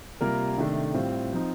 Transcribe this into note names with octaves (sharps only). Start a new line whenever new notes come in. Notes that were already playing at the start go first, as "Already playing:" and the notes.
C3 G3 A#3 F4 A#4
C3 D#3 A3 D4 A4
A2 G3 C4 F4
F3 C4 D#4